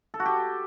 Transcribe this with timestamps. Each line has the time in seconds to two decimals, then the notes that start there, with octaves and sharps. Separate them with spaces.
0.14 A4
0.20 F#4
0.26 G4